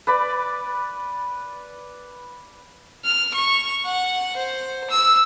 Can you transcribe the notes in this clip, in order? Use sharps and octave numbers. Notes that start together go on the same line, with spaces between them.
B4 D5 B5
F6
C#6
F#5
C5
E6